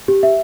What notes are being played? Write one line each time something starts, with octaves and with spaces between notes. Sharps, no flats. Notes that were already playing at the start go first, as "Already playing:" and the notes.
G4
E5